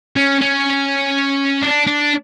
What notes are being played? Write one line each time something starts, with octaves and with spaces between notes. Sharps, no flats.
C#4
C#4
D4
D4